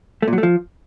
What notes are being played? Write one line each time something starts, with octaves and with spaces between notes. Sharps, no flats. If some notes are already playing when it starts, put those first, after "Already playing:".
A3
A#2
F#3
A3
F3